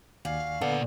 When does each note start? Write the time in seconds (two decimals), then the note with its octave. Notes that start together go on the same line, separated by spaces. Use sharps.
0.25 D#2 F#4 D5 F5 G#5
0.61 A#2 D3 B3 D4 A4 F#5